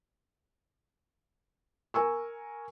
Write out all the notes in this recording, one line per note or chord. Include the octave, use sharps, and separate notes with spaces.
A#4 G#5 C#6 E6